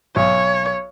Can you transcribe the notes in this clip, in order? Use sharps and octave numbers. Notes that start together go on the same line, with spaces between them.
B1 C#5